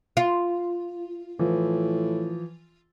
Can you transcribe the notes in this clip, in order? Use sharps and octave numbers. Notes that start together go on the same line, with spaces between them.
F4
A2 E3 F3